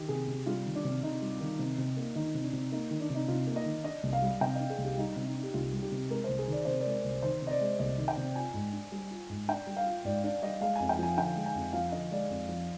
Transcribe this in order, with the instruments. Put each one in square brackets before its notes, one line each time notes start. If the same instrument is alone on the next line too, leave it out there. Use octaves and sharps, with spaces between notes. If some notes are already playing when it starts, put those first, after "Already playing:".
Already playing: [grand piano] D#3 [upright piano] G4
[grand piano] C3 [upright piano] G#4
[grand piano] C3
[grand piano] G3 [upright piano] F4
[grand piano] D#3
[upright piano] D4
[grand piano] C3
[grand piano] C3 [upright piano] D#4
[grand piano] G3
D#3
C3
C3
A#3
[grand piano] D#3 [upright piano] D#4
[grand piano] C3
[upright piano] D4
[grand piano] C3
[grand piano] A#3 [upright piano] D#4
[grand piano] D#3
[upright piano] D4
[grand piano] C3 [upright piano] D#4
[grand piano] C3 [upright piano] F4
[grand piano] A#3
[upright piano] D#5
[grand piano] D#3
[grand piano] D4 [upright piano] D#5
[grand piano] C2
[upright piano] F5
[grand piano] G3
[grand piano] C3 [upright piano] G5
[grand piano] D4 [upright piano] D#5
[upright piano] G#4
[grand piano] C2
[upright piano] G4
[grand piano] G3 [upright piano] D#4
[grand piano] C3
[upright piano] D#4
[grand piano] D4
[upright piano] G4
[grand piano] C2 [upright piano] F4
[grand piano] G3
[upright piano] G4
[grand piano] C3
[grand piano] G#3 [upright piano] A#4
[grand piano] C2 [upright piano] C5
[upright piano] G#4
[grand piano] D#3 [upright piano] D5
[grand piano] C3 [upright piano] C5
[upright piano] D5
[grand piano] G#3
C2
[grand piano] D#3 [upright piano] C5
[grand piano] C3
[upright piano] D#5
D5
[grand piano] G#3
[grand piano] C2 [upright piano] D#5
[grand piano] D#3
[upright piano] G5
[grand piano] C3
[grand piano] F4 [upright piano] G#5
[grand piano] G#2
D4
G3
F4
G#2
[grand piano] D4 [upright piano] G5
[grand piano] G3
[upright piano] F5
[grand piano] F4
[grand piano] G#2 [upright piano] D5
[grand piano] D4 [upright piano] D5
[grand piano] G3 [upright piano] D#5
[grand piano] G#3 [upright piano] F5
[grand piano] F2 [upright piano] G#5
[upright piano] G5
[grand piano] F3 [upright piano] G#5
[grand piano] D3 [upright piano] G5
[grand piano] G#3
[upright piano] G#5
[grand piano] F2
[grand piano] F3 [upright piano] F5
[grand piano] D3 [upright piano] D#5
[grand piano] G#3 [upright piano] D5
[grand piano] F2
F3